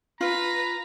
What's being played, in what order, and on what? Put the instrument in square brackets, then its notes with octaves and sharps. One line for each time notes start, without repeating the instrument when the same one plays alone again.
[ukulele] F4 [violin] B4 [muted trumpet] A#5